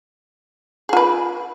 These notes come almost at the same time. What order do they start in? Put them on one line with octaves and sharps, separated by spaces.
G#4 F4 B4